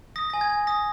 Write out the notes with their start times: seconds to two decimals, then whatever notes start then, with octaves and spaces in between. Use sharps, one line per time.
0.16 D#6 A#6
0.30 G#5 A#6
0.41 G#6
0.50 G#5
0.67 D#6 A#6